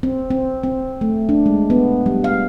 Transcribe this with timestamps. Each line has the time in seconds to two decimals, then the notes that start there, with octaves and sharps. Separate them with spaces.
0.03 C4
0.30 C4
0.63 C4
1.01 A3
1.29 D4
1.46 G#3
1.70 B3
2.06 G3
2.24 F5